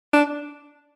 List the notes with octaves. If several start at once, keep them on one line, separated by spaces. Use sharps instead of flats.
D4